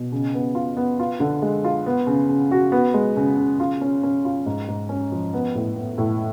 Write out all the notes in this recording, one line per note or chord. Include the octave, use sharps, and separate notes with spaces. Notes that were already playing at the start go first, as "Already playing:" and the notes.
Already playing: B2
C#3
B3
F4
B3
F4
D3
G#3
F4
B3
C#3
C#3
F#4
B3
G#3
C#3
C#3
F4
C#4
C#4
F4
G#2
G#2
C#4
F3
B3
A2
B3
A2